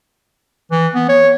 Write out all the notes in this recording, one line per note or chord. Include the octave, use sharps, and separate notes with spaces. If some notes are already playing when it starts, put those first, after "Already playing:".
E3
B3
C#5